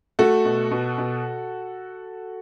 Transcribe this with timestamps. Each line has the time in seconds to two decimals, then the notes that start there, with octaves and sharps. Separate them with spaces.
0.19 A3 F#4 A4
0.45 B2
0.71 B2
0.98 B2